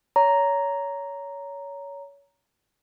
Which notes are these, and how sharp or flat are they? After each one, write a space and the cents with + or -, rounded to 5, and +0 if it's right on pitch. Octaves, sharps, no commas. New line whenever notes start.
C#5 +25 A#5 +0